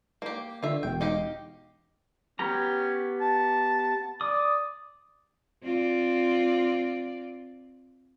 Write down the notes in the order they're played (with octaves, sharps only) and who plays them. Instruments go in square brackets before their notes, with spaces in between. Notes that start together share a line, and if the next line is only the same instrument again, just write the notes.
[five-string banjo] A#3 G4
[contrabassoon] D3 [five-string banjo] F4 E5
[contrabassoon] E1 [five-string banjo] G5
[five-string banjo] D#4 G4 F5
[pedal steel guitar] B3 G4 A#5 [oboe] C#4
[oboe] A5
[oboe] D5 [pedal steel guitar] D#6
[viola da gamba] C4 F4 D5